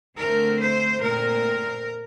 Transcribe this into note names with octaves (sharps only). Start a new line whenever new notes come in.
D3 A3 C4 A#4
C5
A#2 A3 C4 A#4